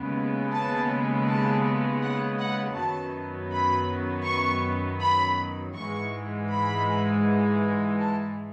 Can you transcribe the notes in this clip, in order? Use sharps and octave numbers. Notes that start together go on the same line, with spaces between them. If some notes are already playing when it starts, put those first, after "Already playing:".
Already playing: D#2 C#3 G#3 B3
A5
A5
F#5
F#5
F#2 D#3 F#3 B3 A5
B5
C#6
B5
G#2 E3 G#3 C#6
B5
A5